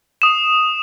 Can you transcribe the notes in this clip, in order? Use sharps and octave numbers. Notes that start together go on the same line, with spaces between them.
D#6 E7